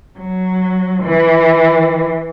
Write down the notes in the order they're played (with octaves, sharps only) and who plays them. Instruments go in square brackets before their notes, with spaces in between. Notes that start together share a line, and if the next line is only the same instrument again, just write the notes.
[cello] F#3
E3